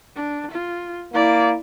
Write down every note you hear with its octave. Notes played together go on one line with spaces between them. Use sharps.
D4
F4
A#3 E4 D5